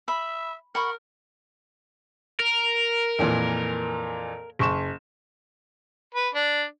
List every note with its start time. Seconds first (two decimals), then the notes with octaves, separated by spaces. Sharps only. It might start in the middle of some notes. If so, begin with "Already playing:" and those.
0.08 E5 B5
0.75 A#4 F#5 B5 C#6
2.40 A#4
3.19 F2 A#2 E3
4.59 F#1 C#6 E7
6.15 B4
6.35 D4